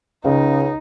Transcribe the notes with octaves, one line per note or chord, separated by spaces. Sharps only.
C#2 C#3 D#4